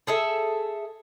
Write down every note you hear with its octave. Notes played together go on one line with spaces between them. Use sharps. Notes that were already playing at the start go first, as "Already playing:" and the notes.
G#4 A4 E5